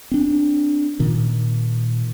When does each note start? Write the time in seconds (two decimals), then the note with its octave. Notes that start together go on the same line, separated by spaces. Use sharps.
0.11 C4 D4
1.00 A#2 D#3